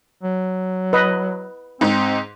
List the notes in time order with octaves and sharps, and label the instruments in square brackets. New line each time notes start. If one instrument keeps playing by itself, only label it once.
[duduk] F#3
[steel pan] B4 D#5
[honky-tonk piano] G#2 D#4 [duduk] C4